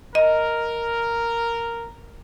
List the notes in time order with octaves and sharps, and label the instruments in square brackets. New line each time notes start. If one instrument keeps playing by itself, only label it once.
[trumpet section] A#4 [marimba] D#5